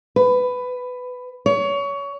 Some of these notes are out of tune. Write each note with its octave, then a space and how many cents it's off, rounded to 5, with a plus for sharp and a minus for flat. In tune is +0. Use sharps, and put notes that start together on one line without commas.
B4 +15
C#5 +25